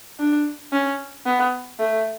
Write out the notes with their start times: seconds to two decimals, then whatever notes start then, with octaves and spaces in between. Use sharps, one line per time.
0.20 D4
0.73 C#4
1.26 B3
1.79 A3